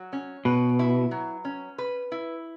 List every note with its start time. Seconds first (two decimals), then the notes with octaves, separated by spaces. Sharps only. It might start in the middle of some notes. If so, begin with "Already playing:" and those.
Already playing: F#3
0.13 C#4
0.45 B2 B4
0.79 E4
1.11 F#3
1.45 C#4
1.78 B4
2.12 E4